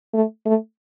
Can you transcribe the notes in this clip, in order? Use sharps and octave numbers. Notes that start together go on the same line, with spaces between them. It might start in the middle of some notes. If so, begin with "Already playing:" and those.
A3
A3